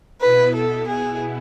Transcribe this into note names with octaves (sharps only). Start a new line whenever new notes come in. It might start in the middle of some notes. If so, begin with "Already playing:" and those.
B2 B3 E4 B4
A4
G#4